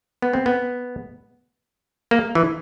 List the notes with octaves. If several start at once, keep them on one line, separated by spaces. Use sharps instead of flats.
B3
C4
B3
A#3
E3